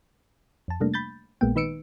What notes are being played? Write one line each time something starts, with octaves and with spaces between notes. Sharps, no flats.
F2 A5
C3 G3 A3 A#3 D4
B5 G6 A6
A#1 A#2 G#3 A#3 B3 G5
D#3 D#4 B4 E6 C#7 D7